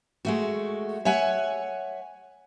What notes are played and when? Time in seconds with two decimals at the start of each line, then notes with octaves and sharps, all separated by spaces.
0.25 G#3 A3 F#4
1.05 C#5 E5 F#5 G#5